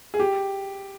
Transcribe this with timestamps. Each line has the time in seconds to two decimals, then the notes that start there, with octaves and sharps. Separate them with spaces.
0.14 G#4
0.19 G4